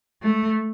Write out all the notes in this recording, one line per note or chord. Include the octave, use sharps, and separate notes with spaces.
A3